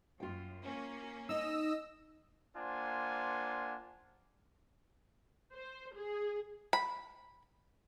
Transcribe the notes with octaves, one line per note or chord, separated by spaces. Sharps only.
F#2 F4 G5
A#3 C#4
D#4 D#5 E6
A#3 D4 F4 C5 F#5 G#5
C5
G#4
B5